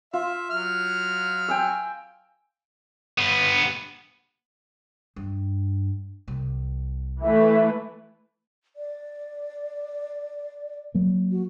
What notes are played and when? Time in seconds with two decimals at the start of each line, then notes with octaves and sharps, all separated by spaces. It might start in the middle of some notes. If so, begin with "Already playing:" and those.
0.13 F4 E5
0.51 F#3 F6
1.48 G5 G#5 E6
3.18 G2 B3
5.16 G2
6.28 C2
7.22 E3 A3 B4 E5
8.76 D5
10.94 F#3 A#3
11.31 F#4